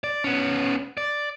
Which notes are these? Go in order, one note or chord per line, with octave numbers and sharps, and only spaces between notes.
D5
B3 C#4
D5